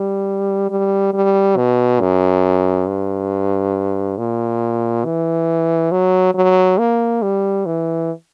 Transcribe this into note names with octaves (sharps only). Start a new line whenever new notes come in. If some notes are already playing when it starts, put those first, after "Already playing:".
Already playing: G3
G3
G3
B2
F#2
G2
A#2
E3
F#3
F#3
A#3
G3
E3